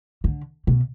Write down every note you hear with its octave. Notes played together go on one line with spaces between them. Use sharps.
D3
B2